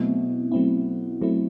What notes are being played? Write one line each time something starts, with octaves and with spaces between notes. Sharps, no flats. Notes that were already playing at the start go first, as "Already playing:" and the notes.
Already playing: B2 F#3 A3 C4 E4
F#3 A3 C4 E4
F#3 A3 C4 E4